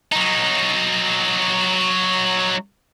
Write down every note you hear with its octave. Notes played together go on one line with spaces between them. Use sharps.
F#3 D#4